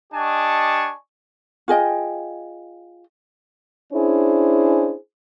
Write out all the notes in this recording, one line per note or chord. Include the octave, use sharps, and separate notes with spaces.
D4 G4 D#5 G#5 A5 C#6
F4 G#4 D#5 G5
C#4 D4 E4 G#4 C5